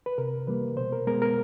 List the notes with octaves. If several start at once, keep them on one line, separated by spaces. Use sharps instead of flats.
B4
C3 A#4
E3 G3 A#3 B4
B2 C5
A#4
G#3 B3 A#4
A#4